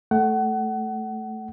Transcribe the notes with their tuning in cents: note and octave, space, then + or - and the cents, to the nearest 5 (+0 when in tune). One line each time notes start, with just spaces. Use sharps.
A3 -5 F#5 +30